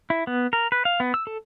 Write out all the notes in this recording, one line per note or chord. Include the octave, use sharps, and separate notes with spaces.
E4
B3
A#4
B4
F5
B3
E6
A4